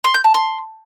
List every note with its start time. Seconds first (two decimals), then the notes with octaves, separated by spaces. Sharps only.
0.04 C6
0.14 G6
0.24 A5
0.34 C6